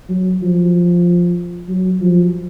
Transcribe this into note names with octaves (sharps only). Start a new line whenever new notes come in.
F#3
F3
F#3
F3